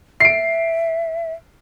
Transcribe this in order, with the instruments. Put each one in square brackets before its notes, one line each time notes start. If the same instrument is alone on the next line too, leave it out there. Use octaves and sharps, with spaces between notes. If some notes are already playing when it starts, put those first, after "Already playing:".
[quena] E5 [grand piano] C7 D7